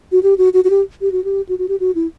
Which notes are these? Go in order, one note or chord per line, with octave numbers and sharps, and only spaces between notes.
F#4
G4
F#4
F#4
F#4
G4
G4
F#4
G4
F#4
F#4
G4
F#4
E4